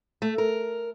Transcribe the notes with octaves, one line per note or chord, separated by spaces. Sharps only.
A3
A#4